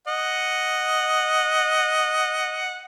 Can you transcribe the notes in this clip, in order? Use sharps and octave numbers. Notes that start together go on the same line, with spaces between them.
D#5 F#5